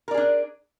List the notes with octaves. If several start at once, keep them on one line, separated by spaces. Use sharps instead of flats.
D4 G#4 A#4 D5